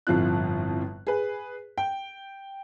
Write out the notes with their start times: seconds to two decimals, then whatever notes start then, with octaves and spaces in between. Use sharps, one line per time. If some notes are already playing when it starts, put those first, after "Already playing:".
0.07 G1 F2 A2 F4 F#6
1.07 G#4 B4
1.78 G5